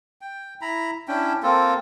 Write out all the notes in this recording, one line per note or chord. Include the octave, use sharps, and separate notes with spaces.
G5
E4 A#5 B5
C#4 D4 E4 G5
A#3 C4 F4 A4